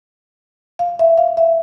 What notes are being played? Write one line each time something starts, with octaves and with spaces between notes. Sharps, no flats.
F5
E5
F5
E5